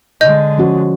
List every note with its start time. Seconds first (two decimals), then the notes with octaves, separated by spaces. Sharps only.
0.21 D3 G#3 D#5 G6
0.58 F3 C#4 F#4